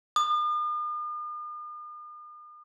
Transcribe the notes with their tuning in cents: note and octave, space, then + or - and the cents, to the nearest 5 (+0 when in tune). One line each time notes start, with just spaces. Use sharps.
D#6 -45